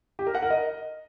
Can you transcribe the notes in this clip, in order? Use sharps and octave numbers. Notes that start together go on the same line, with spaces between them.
G4
A#4
F#5
A#4
D#5